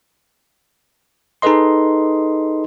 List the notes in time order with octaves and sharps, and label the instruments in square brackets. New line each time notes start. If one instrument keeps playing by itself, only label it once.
[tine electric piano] D#4 G#4 A4 B4 D#5 C6